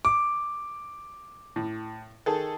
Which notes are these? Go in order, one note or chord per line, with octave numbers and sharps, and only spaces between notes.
D6
A2
D#3 G#4 A4